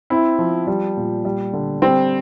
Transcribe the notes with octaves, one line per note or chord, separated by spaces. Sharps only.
C4 E4
F3
G3
A#2
G3
D3
G3 C4